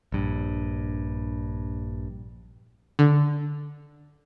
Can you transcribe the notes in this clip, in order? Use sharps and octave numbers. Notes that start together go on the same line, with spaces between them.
A#1 G2
D3